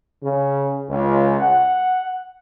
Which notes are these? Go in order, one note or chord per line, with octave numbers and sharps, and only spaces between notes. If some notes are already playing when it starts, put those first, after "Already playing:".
C#3
C#2
F#5